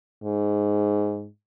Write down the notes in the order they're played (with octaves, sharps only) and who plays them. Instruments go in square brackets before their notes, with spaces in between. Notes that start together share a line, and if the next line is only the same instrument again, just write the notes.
[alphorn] G#2